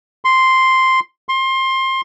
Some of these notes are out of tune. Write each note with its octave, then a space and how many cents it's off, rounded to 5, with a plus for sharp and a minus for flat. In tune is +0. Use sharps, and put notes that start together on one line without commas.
C6 +0
C6 +25